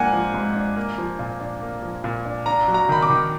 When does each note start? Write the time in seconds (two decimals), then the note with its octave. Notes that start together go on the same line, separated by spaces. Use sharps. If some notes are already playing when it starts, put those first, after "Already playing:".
Already playing: G#2 F3 A#3 D4 F#5 G#5
0.13 F3
0.34 G#2
0.55 D4
0.76 A#3
0.98 F3
1.19 A#2
1.40 D4
1.62 A#3
1.83 F3
2.04 A#2
2.25 D4
2.46 D4 A#5
2.68 F#3
2.74 A#5
2.89 D#3 B5
3.02 D6
3.10 D#3